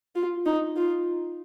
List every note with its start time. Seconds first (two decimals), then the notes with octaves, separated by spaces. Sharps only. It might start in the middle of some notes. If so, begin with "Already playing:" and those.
0.15 F4
0.46 D#4
0.76 F4